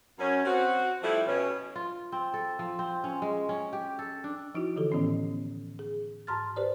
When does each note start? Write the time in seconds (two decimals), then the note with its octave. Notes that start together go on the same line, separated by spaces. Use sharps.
0.18 F#2 C#4
0.45 C4 F#4
1.03 F3 G3 A3 E4
1.26 B2 C#4
1.75 F4
2.12 C4
2.34 A4
2.59 F3
2.79 C4
3.04 C#4
3.22 G#3
3.49 C#4
3.73 G4
3.99 A4
4.24 D4
4.55 F3 D#4 E4 F#4
4.76 D3 E3 G4 A4
4.92 A2 D#3 E3 B3 C#4
5.79 G#4
6.27 G#2 A5 A#5 C6 F6 A6
6.56 G4 B4 C5 D5